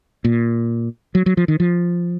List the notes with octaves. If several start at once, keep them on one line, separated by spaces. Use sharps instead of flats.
A#2
F#3
F#3
F3
D#3
F3